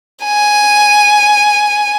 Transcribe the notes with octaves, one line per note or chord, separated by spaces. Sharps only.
G#5